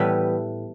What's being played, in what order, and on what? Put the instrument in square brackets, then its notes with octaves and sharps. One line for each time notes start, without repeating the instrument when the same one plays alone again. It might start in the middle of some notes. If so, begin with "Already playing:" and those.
Already playing: [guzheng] A2 E3 G3 B3 B4